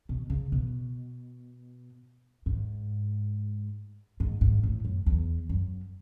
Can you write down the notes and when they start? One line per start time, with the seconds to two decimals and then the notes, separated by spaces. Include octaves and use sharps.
0.09 B2
0.30 C#3
0.52 B2
2.46 G#2
4.20 G#2
4.41 G#2
4.63 A2
4.85 F#2
5.06 E2
5.49 F#2